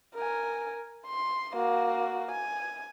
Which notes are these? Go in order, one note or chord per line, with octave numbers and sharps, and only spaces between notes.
A#4 G#5
C6
A#3 F#4
G#5